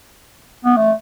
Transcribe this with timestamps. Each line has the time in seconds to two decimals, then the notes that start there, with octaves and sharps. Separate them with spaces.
0.65 B3
0.77 A3